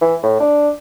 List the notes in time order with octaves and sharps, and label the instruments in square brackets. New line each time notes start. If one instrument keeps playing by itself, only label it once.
[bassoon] E3
A2
D4